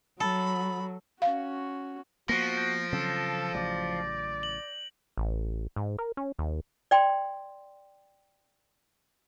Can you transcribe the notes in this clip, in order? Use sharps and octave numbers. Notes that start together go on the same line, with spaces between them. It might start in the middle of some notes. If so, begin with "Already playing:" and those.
F#3 A4 B5
C#4 F#4 F5
F3 A#3 B3 F#4 A#6 D7
G6
C#3 F#3 C4 A4
A1 C#3 F#3 D5
F#7
A1
G#2
A#4
C#4
D#2
D5 G5 C6